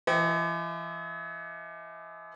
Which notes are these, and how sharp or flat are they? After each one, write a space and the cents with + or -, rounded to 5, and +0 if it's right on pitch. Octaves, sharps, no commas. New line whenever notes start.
E3 +45 D#5 +45 G5 +0